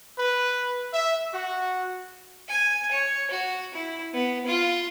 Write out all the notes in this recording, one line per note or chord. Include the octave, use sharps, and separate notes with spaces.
B4
E5
F#4
G#5
C#5
F#4
E4
B3
F4